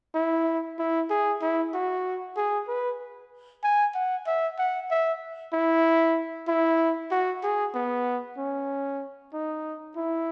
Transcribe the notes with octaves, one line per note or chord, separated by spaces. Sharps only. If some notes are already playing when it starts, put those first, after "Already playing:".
E4
E4
G#4
E4
F#4
G#4
B4
G#5
F#5
E5
F#5
E5
E4
E4
F#4
G#4
B3
C#4
D#4
E4